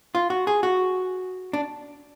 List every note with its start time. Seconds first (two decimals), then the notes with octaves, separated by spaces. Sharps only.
0.15 F4
0.30 F#4
0.47 G#4
0.63 F#4
1.53 D4